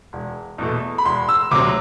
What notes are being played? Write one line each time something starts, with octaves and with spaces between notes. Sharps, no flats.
E1
E2 B2 A3
B5
E1 C6
E6
D2 C3 F#3 C4 D6